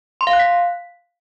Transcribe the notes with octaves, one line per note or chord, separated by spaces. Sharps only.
C6
F5
F#6
B6